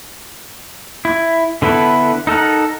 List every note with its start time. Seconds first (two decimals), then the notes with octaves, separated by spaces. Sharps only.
1.05 E4
1.62 D3 B3 E4 A4 B4
2.27 D#4 A4 A#4 F#5